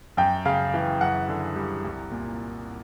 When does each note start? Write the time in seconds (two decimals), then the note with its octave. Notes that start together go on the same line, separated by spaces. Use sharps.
0.17 F#2 G5
0.46 C#3 F5
0.74 E3
1.01 F#2 F#5
1.29 D3
1.56 G3
1.84 C2
2.11 A#2